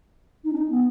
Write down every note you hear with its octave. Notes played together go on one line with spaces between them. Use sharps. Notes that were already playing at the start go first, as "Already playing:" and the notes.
D#4
C#4
D#4
B3